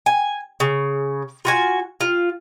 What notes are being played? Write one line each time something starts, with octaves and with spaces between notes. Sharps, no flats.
G#5
C#3
F4 F#4 G#5
F4